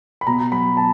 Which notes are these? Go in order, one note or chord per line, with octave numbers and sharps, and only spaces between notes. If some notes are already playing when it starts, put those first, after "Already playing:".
B5
B2 A#5
F#3 B5
A5